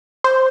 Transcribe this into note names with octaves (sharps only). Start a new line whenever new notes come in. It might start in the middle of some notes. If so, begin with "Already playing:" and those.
C5